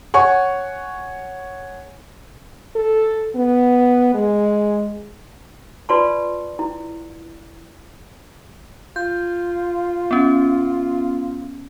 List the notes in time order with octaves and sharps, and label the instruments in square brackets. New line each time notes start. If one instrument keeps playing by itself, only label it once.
[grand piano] C#5 F#5 G#5 C#6
[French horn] A4
B3
G#3
[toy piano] F4 B4 D5 A5 C6 C#6
E4
[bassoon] F4 [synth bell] G6
[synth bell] B3 C#4